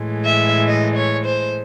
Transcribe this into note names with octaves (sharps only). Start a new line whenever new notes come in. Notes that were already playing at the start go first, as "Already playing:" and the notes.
Already playing: A2 E3 G#3
E5
D#5
C#5
C5